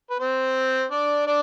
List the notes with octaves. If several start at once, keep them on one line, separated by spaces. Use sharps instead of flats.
B4
C4 C5
D4 D5
D4 D5